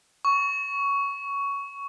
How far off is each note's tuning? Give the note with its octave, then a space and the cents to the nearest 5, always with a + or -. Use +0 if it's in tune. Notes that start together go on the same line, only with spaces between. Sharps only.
C#6 +15